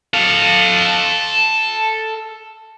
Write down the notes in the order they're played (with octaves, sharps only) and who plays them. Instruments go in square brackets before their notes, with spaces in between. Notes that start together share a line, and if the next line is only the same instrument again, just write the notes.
[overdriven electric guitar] A4 F5